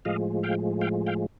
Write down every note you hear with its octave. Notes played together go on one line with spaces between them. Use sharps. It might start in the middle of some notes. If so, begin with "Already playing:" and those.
A2 F3 G#3 D#5 F5
F5 G5
F5 G5
F5 G5